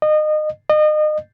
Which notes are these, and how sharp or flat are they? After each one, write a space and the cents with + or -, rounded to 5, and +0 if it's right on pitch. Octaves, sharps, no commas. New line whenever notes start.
D#5 -25
D#5 -30